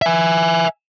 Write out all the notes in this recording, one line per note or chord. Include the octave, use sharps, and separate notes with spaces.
E5 G#5